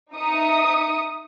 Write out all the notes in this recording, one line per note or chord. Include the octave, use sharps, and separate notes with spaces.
D#4 E5 D#6 C#7